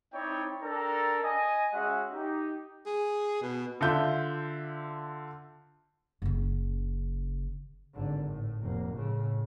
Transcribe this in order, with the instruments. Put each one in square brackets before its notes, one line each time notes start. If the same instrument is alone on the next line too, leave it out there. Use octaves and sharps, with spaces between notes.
[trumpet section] C4 D#4 E4 C#5 D5 G5
D4 A4 A#4 G5 A#5
D#5 G#5
G#3 C#4 F#4 G#4 E5 F#5
D#4 G4
[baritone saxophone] G#4
B2
[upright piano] D3 F4 E5 G6
[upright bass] F#1 C#3
[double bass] G#1 D3
A2
F1 A#3
A2 C#3